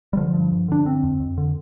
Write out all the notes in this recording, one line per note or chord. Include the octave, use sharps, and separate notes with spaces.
G3
D3 F3
G2
G2
D3 D4
D3 C4
F2
F2
D3